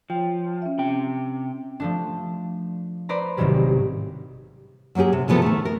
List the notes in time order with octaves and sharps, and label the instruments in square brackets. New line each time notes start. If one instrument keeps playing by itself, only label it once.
[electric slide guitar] F3 [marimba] C#5 G5
[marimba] C#4 E5
[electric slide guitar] C3 G5 [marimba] C#4
[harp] F3 A3 D4
B4 C5 D5 A#5
A1 G#2 C3 D#3 F#3 G3
[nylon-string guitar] F#3 A#3 C#4 G4 G#4
C3
C3 E3 F3 B3 G#4 A4
D#3 A3
A#4